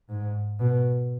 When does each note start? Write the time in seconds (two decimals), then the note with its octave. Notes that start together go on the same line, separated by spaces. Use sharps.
0.09 G#2
0.60 B2